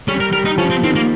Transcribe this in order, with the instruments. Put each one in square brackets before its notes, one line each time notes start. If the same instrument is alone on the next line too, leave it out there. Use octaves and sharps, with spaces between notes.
[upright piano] G3 [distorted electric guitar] C#4
[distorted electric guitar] A#4
[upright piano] G3 [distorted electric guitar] A#4
[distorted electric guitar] D#4
[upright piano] F3 [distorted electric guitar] C#4
[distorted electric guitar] C4
[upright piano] D#3 [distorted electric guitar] C4
[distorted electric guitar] A#3